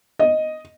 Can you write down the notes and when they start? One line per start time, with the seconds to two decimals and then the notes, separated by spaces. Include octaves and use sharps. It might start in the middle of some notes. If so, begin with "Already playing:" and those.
0.19 D#5